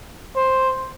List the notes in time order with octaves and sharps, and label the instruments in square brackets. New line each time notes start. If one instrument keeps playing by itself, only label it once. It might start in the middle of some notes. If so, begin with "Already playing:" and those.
[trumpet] C5